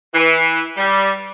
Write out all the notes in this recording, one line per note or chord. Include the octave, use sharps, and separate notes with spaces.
E3
G3